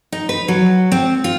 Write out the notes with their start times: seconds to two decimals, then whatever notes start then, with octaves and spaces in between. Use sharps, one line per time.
0.12 D#4
0.29 B4
0.48 F#3
0.92 C4
1.24 F4